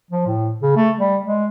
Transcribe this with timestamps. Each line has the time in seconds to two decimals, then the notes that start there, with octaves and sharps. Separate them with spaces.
0.11 F3
0.26 A2
0.63 C#3
0.76 A3
0.99 G3
1.27 G#3